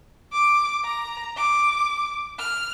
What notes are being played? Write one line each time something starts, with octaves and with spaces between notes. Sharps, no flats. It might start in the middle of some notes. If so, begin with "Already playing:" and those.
D6
A#5
D6
F6